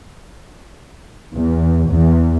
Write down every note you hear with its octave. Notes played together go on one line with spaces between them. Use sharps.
E2
E2